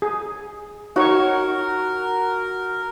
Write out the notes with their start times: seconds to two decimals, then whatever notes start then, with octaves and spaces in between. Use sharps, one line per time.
0.02 G#4
0.96 D#4 F#4 A#4 C#5 C#6